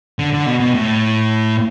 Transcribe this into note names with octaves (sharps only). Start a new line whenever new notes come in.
D3
D3
B2
B2
A2